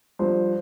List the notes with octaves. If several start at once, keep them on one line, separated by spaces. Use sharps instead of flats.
G2 F3 C5